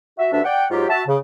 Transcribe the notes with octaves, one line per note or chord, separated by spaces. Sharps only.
F#4 E5
D2 G2 D4 E5
D5 F#5 G5
G#2 F#3 F4 G4
F#4 E5 A5
C#3